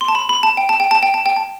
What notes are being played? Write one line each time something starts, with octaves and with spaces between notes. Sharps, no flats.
C6
A5
B5
B5
A5
G5
A5
G5
A5
G5
A5
G5
A5